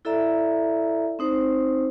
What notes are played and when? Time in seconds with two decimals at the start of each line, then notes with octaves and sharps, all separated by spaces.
0.05 E4 A4 D5 E5 A#5
1.19 C4 D#4 C5